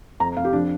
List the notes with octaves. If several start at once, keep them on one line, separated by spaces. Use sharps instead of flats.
F2 A#5
F2 F5
G4
F3 D4